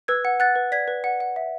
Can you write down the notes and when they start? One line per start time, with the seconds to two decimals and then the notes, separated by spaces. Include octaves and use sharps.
0.08 B4 E6 G#6
0.25 F#5
0.40 F#5 F#6 A6
0.56 B4
0.72 D5 G#6 B6
0.88 B4
1.04 F#5
1.20 F#5
1.36 E5